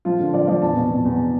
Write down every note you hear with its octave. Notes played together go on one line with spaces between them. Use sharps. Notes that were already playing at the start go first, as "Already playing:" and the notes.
F3 F4
D3
F3 D5
F3 D5
E2 A5
B2
B2
E2